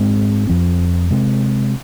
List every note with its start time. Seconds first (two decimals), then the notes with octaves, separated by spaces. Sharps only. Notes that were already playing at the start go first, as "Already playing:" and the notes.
Already playing: G#2 G#3 C4
0.47 F2 F3 C4
1.10 C3 G#3 C4